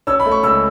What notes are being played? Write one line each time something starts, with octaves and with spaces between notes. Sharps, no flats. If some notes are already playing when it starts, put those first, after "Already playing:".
C#4 E6
B5
A3
C#6
C#2 E6